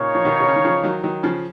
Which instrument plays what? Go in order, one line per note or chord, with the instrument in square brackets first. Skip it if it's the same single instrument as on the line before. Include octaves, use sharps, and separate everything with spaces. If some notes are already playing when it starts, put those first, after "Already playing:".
Already playing: [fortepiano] A#2 C#3 [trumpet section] D#4 A#4 C#5 F5
[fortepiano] F3
B2 D#3
B2
C#3
D#3
C#3 F3
D#3 F#3
D#3 F#3
C#3 F3